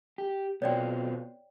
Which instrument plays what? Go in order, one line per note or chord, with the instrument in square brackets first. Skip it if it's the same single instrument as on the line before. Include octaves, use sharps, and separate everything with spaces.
[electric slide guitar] G4
[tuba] B2 [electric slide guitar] B3 C4 F4 [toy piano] C#5 D5 G5